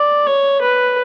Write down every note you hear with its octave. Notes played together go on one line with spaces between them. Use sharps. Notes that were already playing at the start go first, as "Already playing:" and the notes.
Already playing: D5
C#5
B4